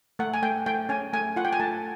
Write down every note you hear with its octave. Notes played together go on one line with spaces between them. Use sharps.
A3 F#5
G#5
A3 G5
A3 G5
C#4 G#5
A3 G#5
F4 F#5
G5
G#5
A3 A5